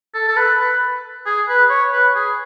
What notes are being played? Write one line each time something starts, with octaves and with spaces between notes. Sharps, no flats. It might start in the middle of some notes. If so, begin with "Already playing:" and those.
A4
A4
B4
B4
G#4
B4
C#5
B4
G#4